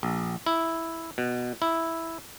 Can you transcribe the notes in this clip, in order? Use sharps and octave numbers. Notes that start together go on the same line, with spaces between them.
A#1
E4
B2
E4